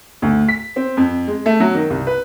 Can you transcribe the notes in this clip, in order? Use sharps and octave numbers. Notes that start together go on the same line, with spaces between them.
D2
B6
C4
F2
G#3
A3
F#3
D#3
C2
B4